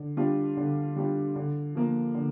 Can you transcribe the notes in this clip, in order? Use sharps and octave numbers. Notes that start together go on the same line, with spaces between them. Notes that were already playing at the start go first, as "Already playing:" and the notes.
Already playing: D3
G3 D4 F4
D3
G3 D4 F4
D3
F3 A#3
D3